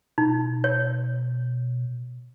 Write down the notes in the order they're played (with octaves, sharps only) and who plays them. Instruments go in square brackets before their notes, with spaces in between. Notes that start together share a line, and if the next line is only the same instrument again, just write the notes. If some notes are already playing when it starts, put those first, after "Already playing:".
[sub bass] B2 [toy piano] D#4
[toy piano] C#5